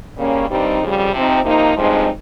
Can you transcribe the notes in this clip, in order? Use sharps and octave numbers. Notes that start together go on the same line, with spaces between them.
C#3 G3 A#3 C#4
G2 D#3 G3 C4 D#4
F2 C#3 G3
C3 F3 C4 D#4
C3 F3 A#3 D#4
G2 F3 G#3 C4 D#4